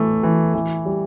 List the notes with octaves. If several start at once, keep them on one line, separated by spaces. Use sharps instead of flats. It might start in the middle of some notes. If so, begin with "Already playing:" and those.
Already playing: E3 A3
E3
E3
G3